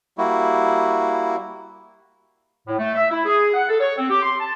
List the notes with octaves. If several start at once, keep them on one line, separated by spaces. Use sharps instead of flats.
G3 A#3 E4 F#4
A2
A3
E5
E4
G#4
F#5
A4
C#5
C4
G4
C6
A5